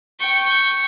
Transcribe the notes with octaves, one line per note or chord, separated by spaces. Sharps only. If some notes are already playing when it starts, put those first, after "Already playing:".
G5 C#6